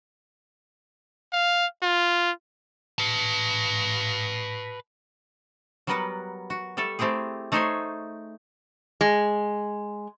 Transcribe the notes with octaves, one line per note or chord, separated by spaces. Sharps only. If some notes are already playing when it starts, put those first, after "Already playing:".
F5
F4
B4 A5
F#3 G3 B3 A#4 B4 F#5
F#4
G3 A3 A4 E5
A3 C4 E4 G4 G#4
A3 D#4 G#4 C5 C#5 G#5
G#3